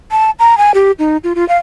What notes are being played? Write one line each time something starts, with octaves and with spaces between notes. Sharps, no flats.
A5
A#5
G#5
G4
D#4
F4
F4
F5